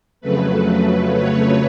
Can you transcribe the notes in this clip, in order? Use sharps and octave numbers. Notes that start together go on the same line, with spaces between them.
F2 C#3 F#3 A3 B4
C#5